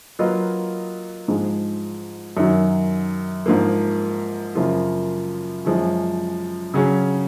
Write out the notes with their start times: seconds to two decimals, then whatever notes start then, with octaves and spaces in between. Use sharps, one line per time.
0.19 F#3 A#3 F4 B4 D#5
1.28 G#2 F3 G#3
2.37 F#2 D#3 F#3
3.46 G#2 F3 A#3
4.55 F#2 C#3 F3 A#3 F4
5.65 F#2 F3 G#3 C#4
6.74 C#3 F#3 C#4 G#4